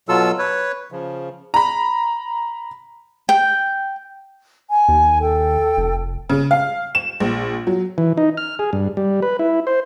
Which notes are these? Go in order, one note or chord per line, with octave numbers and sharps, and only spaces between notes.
B2 F#3 F4 A4 E6
B4 C#5
C#3 F3
A#5 B5
G5
G#5
D#2
A4 G5
F1
C#3
F5
E7
A#1
F#3
E3
D#4
F6
G#4
G2
G3
B4
E4
C5